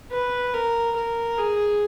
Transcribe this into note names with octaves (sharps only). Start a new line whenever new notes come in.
B4
A#4
A#4
G#4